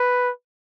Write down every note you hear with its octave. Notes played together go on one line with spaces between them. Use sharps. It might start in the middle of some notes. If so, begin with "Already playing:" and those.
Already playing: B4